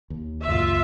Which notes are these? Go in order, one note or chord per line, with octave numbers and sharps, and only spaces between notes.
D#2
C#2 F#2 A#2 F4 E5